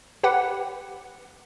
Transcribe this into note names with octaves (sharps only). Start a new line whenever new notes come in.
G4 B4 F#5